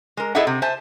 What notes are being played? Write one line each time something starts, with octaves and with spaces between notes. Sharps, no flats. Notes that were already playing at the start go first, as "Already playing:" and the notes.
G#3 A#4
E4 G#4 A4 D#5 E5 F#5
C3
C5 E5 G#5 A5